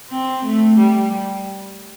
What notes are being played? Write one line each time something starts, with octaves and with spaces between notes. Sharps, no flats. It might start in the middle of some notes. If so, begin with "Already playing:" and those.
C4
A3
G3